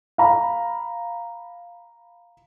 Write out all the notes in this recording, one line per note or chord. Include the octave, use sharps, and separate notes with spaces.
F5 A#5 B5